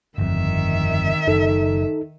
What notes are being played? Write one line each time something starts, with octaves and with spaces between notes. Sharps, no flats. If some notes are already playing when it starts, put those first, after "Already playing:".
G1 F2 D#3 E5
F#1 D#4 A4